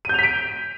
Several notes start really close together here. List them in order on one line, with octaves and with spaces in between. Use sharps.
D#7 G6 F7 B6 D7